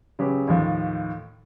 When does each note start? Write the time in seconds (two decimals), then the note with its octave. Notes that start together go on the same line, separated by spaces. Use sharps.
0.19 C#3 F#3 G4 B4
0.47 D#2 A2 D#3 F3 A3